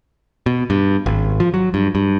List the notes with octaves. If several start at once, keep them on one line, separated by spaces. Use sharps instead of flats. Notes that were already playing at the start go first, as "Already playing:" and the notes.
B2
G2
G#1
F3
F#3
G2
G2